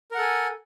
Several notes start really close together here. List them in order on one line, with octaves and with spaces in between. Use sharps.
A#4 F#5 A4 G#5